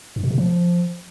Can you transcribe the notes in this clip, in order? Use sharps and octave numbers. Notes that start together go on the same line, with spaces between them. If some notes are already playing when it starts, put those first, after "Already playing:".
G2
B2
C3
F3